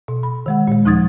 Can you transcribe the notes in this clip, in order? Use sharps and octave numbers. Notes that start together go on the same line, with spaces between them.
B2
B5
D#3 G#3 F#5
A#2 G#3
D#2 F3 D#4 D#6 G#6 A6